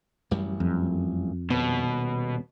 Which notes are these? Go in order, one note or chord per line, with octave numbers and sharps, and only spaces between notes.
A1 F#2 G3
F2
D#1 B2 B3